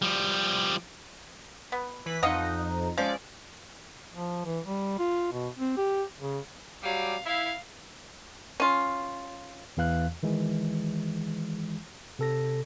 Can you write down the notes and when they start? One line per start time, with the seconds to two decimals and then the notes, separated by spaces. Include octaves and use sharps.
0.02 F3 G3
1.72 B3
2.06 E3 B4 B6
2.23 F2 F3 D#4 D#5 F5 F#5
2.98 F3 G#3 C#4 D5
4.14 F3
4.45 E3
4.65 G3
4.99 F4
5.32 B2
5.59 C4
5.77 G4
6.20 C#3
6.82 F#3 G3 F5
7.26 E4 F5
8.60 C#4 F4
9.77 E2 E3 F5 F#6
10.23 D#3 E3 G#3
12.19 C3 A4 A#6